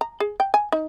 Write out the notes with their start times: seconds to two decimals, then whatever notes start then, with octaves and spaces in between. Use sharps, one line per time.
0.01 A#5
0.20 G#4
0.40 G5
0.54 G#5
0.72 D#4